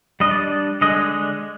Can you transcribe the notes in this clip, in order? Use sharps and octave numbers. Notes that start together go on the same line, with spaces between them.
G3 D4 D#5
D5
D3 G#3 D4 D#5